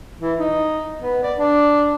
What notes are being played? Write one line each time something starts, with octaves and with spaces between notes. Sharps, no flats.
E3
D#4
B3
D5
D4